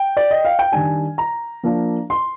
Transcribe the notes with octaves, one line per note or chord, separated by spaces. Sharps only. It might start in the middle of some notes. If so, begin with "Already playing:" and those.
Already playing: G5
D5
D#5
F5
G5
D#3 G3 D4 G#5
A#5
F3 A#3 D4
C6